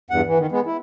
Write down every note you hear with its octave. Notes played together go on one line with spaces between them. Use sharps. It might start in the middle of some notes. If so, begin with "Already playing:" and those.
E2 G2 F#5
E3
D#3
G#3 B3
E4